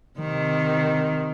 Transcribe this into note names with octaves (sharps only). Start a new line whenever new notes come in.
C3 D#3